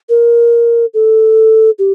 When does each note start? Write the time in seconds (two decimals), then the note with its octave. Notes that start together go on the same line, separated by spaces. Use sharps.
0.09 A#4
0.94 A4
1.79 G4